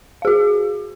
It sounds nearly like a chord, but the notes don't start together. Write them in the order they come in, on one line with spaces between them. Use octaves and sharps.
F5 G#4 F#4